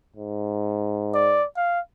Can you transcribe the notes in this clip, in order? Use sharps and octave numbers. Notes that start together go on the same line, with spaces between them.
G#2
D5
F5